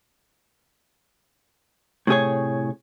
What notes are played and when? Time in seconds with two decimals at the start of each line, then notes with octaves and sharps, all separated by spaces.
2.07 A2 C3 G#4 C#5